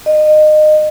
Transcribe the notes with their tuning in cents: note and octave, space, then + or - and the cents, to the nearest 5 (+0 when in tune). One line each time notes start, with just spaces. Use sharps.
D#5 -25